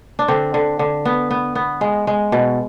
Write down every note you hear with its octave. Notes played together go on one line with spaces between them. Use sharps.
D4
D3 C4
D3
D3
B3
B3
B3
G#3
G#3
B2